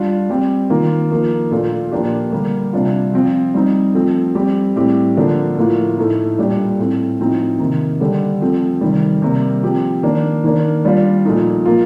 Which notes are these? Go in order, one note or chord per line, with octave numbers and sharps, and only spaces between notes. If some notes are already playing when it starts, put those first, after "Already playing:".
Already playing: G3 D4 F4
G3 C4 G4
D#3 A#3 F4
F3 A#3 D#4
A#2 A3 D4 F4
A#2 F3 A#3 D4 G4
D3 G3 A#3
C3 G3 D4 F4
F3 C4 F4
G3 C4 D#4
F3 A3 C4
G3 C4 G4
A2 G3 C4 G4
D3 F3 A#3 D4
A2 F3 A#3 F4
A2 A3 D#4
A#2 G3 D4 G4
A2 A3 C4
A2 F3 C4 D#4
C3 D#3 A#3 D#4
D3 G3 D4 G4
F3 A3 C4
C3 D#3 G3
C3 G3 A#3
F3 C4 G4
D#3 A#3 D4
D#3 A#3 D4
G3 D4 F4
A#2 F3 A3 D#4
F3 A#3 F4